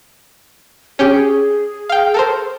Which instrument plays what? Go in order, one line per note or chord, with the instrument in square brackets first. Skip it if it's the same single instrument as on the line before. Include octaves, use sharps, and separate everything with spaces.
[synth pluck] C#4 G4 [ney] G#4
[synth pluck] F5 G5
A4 A#4 C5